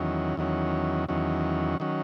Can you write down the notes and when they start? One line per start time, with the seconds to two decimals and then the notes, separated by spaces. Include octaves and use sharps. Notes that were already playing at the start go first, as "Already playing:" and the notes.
Already playing: E2 D#3 F#3 C#4
0.37 E2 D#3 F#3 C#4
1.09 E2 D#3 F#3 C#4
1.80 D#3 F#3 C#4